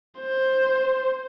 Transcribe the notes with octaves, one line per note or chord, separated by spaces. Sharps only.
C5